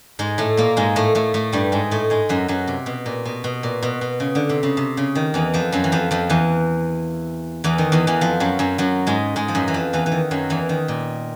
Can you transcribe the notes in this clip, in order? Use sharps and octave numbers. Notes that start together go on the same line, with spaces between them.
G#2 G#3
A2 A3
A#2 A#3
G#2 G#3
A2 A3
A2 A3
A2 A3
G2 G3
G#2 G#3
A2 A3
G#2 G#3
F#2 F#3
F#2 F#3
C3
B2
A#2
B2
B2
A#2
B2
B2
C#3
D3
C3
C#3
C3
C#3
D#3
E2 E3
F2 F3
F#2 F#3
E3
F2 F3
F2 F3
E2 E3
E2 E3
D#3
E2 E3
E2 E3
F2 F3
F#2 F#3
F#2 F#3
F#2 F#3
G#2 G#3
G#2 G#3
F3
F#2 F#3
E3
F2 F3
E2 E3
E3
D#3
F#2 F#3
E2 E3
D#3
A#2